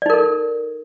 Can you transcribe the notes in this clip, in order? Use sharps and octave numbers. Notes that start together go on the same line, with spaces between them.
D#4 A4 A#4 D5